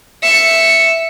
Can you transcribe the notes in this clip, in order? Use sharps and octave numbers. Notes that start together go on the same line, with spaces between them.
E5 C#7